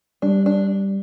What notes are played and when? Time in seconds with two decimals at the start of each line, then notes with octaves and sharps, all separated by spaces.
0.22 G3 D4
0.46 D4